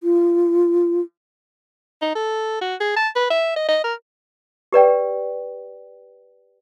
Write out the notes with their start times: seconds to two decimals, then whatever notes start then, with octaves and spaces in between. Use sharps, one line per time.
0.03 F4
2.02 D#4
2.15 A4
2.61 F#4
2.81 G#4
2.97 A5
3.16 B4
3.30 E5
3.56 D#5
3.69 D#5
3.84 A#4
4.72 G4 B4 D5 G5